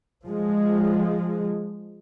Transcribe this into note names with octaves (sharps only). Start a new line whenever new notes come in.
F3 G#3